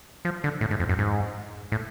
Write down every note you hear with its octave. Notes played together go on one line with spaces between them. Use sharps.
F3
D3
A2
G#2
F2
F#2
G#2
A2